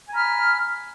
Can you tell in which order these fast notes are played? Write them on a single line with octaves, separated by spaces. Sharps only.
G#5 A#5 B5 F6